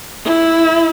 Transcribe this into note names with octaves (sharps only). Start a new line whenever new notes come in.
E4